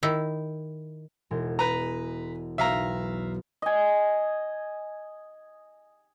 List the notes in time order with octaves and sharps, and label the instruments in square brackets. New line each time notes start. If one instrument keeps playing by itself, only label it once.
[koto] D#3 E4
[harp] E1 G#3
[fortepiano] B4 A#5
[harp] B1 [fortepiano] E5 F5 A#5
[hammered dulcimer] D#5 G#5